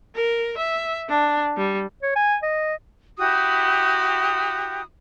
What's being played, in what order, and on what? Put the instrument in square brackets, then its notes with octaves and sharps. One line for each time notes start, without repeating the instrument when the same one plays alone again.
[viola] A#4
E5
D4
G3
[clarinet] C#5
G#5
D#5
[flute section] E4 F#4 G4 D#6